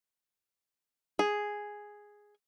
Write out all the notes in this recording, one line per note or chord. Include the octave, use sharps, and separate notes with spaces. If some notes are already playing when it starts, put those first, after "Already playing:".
G#4